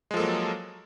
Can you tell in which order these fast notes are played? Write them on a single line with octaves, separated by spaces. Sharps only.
G#3 F3 A4 A#3 F#3